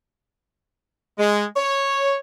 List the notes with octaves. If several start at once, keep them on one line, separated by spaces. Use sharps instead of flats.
G#3
C#5